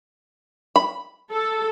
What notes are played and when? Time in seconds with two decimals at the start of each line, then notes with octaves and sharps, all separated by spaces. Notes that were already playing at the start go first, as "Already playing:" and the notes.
0.76 B5
1.32 A4